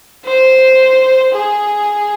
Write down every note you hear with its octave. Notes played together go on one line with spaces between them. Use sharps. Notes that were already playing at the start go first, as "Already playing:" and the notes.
C5
G#4